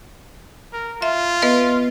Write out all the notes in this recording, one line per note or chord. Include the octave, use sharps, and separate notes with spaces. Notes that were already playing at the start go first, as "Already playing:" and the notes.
A#4
F4 E5
B3 B4 D#5